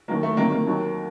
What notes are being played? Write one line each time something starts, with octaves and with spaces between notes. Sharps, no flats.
D#2 D#3 F#3 A#3
A3
D2 C3 D#3 F#3 A#3
A#3
D#2 D#3 F#3